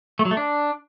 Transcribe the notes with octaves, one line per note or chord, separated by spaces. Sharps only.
A3
F#3
A3
D4